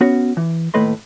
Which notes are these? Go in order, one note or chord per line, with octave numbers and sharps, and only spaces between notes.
B3 C#4 F#4
E3
D#2 A2 A3 B4 D#5 C6